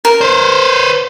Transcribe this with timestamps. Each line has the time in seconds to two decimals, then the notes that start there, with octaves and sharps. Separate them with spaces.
0.05 A#4
0.21 B4 C5